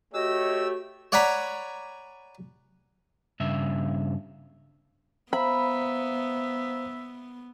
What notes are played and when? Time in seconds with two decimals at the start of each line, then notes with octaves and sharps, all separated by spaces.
0.14 A3 F#4 G4 C#5 D#5 E6
1.12 C#5 D5 F#5 G#5 A#5 B5
3.40 G2 C#3 E5
5.33 B3 C5 E5 F5 A#5 B5